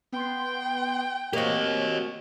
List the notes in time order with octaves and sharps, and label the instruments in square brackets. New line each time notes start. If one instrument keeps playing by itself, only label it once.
[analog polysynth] B3 C6 [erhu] G5
[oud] A#3 C4 [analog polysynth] F#4 C#5 [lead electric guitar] G4 D#5